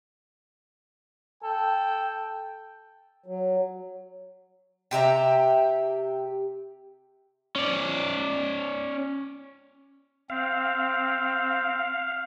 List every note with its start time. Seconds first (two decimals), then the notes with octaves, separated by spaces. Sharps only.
1.43 A4 G5
3.26 F#3
4.91 C3 G4 E5 A#5
7.56 C#4 D5
10.30 C4 F5